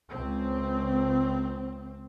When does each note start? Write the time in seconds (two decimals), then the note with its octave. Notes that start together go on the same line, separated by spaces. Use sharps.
0.10 C#2 C4